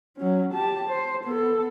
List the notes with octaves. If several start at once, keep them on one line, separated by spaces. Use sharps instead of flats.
F#3 C#4
G4 A5
C5
B3 A4